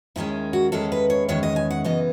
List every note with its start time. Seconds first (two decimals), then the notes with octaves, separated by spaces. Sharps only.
0.16 D#2 D#3 G#3 C#4 E4
0.53 F#4
0.72 E2 D#3 G#3 C#4 A4
0.92 B4
1.10 C#5
1.28 E2 D#3 G#3 C#4 C#5
1.43 D#5
1.56 G#5
1.71 F#5
1.84 F#2 C#3 E3 B3 D#5